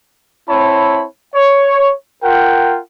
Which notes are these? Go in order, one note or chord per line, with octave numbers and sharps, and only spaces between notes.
C4 E4 C#5 A5 B5
C#5
F4 A#4 F#5 G5